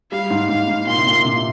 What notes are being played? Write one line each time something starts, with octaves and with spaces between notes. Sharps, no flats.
G3 F5
G#2
G#2 F5
G#2
A#2 C6
C3
A#2
C3